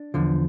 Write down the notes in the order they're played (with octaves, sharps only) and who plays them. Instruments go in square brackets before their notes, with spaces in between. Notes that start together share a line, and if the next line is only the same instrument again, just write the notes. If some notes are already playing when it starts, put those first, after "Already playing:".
Already playing: [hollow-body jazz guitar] D4
E2 D3 F3